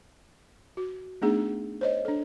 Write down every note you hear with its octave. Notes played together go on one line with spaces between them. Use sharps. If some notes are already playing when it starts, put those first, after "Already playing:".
F#4
A3 B3 D4 D#4 G#4
C5 C#5 D#5
D4 A4